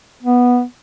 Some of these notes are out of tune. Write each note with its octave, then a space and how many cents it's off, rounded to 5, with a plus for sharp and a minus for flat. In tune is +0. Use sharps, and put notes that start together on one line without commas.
B3 -10